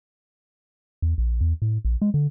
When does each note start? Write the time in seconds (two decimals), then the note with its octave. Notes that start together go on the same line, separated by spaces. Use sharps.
1.02 E2
1.18 A#1
1.41 E2
1.62 A2
1.85 A#1
2.02 G#3
2.14 D3